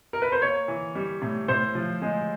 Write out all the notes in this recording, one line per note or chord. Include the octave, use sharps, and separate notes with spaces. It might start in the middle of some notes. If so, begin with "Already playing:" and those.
A#4
B4
C5
A#3 C#5
E3
G3
A2
A2 C5
F3
G#3